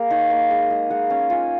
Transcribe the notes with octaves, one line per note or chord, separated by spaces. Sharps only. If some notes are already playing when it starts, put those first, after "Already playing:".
Already playing: A#3 G#4
D#4 C#5
A#3
G#3 D#5
G#3
G#3 F#5
C#4
F4 G#5